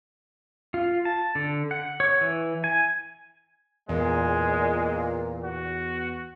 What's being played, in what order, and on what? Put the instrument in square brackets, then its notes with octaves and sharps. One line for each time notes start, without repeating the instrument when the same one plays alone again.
[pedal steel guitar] F4
A5
D3
F#5
C#5
E3
G#5
[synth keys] E2 [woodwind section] A#2 [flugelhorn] G#3
[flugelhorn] F#4